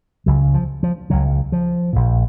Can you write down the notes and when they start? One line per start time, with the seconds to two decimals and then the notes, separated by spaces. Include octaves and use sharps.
0.26 C#2 C#3 F#3
0.54 F3
0.83 F3
1.10 C#2 C#3 F#3
1.52 F3
1.93 A#1 A#2